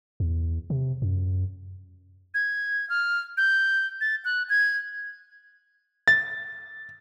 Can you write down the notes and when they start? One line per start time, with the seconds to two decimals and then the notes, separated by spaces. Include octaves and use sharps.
0.20 E2
0.70 C3
1.02 F#2
2.34 G#6
2.90 F6
3.37 G6
4.01 A6
4.25 F#6
4.49 G#6
6.08 A6